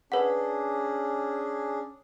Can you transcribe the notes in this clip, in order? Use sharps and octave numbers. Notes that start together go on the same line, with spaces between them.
C#4 D4 G#4 B4 F#5